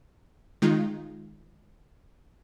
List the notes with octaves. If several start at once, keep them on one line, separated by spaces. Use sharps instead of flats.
D#3 G#3 D#4 F4